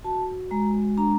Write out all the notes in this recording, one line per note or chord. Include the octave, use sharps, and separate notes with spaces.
F#4 A5
G#3 A#5
D4 A#5